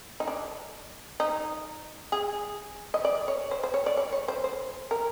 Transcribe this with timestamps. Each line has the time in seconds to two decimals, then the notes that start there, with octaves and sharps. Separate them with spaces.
0.20 D#4
0.27 D4
1.20 D#4
2.12 G#4
2.94 D#5
3.05 D5
3.28 C#5
3.51 C5
3.63 C5
3.74 C#5
3.86 D5
3.97 C#5
4.12 C#5
4.28 C5
4.44 C5
4.91 A#4